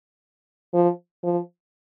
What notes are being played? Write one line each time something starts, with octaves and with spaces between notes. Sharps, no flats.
F3
F3